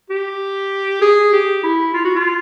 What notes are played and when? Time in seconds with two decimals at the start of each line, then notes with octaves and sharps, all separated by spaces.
0.10 G4
1.02 G#4
1.33 G4
1.63 E4
1.94 F4
2.05 F#4
2.15 F4